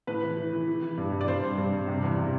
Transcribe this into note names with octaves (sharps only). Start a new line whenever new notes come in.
A2 B4
E3
E3
E3
E3
E3
G2
G2
D5
G2 C5
G2
G2
G2
C3
E2
C3